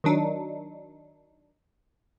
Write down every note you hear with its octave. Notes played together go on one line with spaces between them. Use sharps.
D#3 F#3 D4 D#4